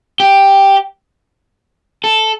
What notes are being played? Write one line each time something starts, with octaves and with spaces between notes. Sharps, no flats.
G4
A4